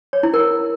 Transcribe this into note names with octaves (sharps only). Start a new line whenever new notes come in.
C#5
E4
A#4